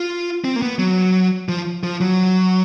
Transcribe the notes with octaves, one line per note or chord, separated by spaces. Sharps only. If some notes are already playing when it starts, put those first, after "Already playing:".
Already playing: F4
C4
A#3
B3
F#3
F3
F3
F#3